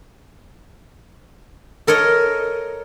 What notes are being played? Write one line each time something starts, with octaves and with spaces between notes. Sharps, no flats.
A4 A#4 C#5 D#5